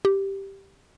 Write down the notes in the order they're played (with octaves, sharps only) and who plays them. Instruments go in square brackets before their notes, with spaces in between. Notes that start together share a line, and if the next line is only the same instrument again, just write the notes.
[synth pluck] G4